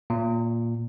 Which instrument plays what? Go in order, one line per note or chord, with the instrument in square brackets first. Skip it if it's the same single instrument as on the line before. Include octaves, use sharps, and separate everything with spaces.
[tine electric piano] A#2